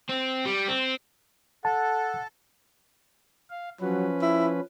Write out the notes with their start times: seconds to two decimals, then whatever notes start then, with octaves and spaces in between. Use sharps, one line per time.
0.10 C4
0.45 G3
0.68 C4
1.65 A4 F#5 A5
3.50 F5
3.81 F3 F#3 C#4 B4
4.22 E4